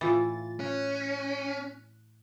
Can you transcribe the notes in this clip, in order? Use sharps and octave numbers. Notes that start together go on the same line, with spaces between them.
A2 E3 F4 A6
C#4 F#6